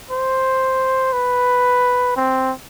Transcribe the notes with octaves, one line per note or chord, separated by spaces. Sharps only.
C5
B4
C4